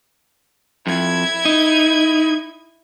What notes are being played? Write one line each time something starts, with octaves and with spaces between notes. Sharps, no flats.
F2 E4 G#6
D#4